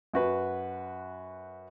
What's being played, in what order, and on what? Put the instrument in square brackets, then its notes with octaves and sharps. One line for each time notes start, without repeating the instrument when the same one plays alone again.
[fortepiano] F#2 F#4 B4